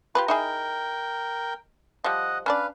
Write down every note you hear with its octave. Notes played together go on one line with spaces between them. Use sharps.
F4 G4 G#4 B4 C6
D#4 E4 G#4 A#4 G5
F3 G3 D#5 F#5
C#4 D4 B4 D5 F5